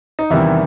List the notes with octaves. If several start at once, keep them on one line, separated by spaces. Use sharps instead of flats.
D#4
E2 C3 D#3 E3 G3 E4